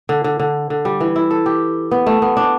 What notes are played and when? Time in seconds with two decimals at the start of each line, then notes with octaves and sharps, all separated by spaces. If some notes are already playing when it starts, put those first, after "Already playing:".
0.09 D3
0.24 D3
0.40 D3
0.70 D3
0.85 G3
1.00 E3
1.16 E4
1.31 A4
1.46 G4
1.91 B3
2.06 A3
2.22 B3
2.37 D4